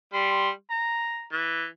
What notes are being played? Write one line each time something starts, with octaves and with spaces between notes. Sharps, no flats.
G3 C6
A#5
E3